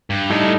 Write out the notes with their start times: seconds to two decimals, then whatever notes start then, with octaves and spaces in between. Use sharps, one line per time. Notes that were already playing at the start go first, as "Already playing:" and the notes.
0.10 G2
0.30 A2 G3 D#4 A4